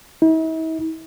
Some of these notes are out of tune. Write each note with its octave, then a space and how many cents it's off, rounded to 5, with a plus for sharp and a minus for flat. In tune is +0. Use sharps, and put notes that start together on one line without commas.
E4 -45